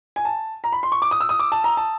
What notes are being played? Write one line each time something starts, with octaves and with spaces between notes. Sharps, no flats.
G#5
A5
A#5
B5
C6
C#6
D6
D#6
E6
D#6
D6
A5
A#5
A5